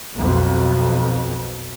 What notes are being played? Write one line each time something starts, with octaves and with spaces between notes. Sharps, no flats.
B1 F2 B2